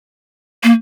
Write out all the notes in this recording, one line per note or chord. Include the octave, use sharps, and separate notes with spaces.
A#3